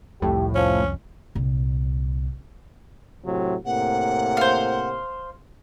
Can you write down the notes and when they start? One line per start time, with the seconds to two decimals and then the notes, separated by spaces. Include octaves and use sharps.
0.22 C2 F2 A2 G4
0.55 F3 C#4
1.35 C2 A#2
3.26 A2 C3 F#3
3.65 A2 C3 A#3 F#5
4.37 C5 F5